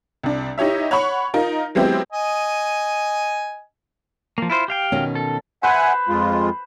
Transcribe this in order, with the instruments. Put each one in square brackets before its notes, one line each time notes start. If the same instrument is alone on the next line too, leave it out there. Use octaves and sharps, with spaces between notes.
[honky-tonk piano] C2 D4
D#4 E4 G4 C#5 E5
C#5 F#5 B5 C#6
D#4 F4 A#4
F#3 G#3 B3 C4 E4 G4
[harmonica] D#5 G#5
[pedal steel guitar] F3 A#3
E4 F4 C5
G4 F5 G5
[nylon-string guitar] B2 D#3 C#4
[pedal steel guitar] A4
[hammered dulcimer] B4 C5 [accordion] E5 F#5 G#5
[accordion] F2 G#3 F4